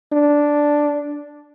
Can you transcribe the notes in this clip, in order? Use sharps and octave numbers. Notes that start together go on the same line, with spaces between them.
D4